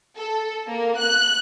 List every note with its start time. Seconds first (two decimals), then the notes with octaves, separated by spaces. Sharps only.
0.18 A4
0.70 A#3
1.00 F#6